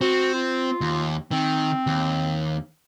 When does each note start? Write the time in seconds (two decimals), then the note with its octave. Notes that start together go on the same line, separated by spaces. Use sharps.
0.01 C4 F#4
0.35 F4
0.81 D#2
1.31 D#3 C4
1.87 D#2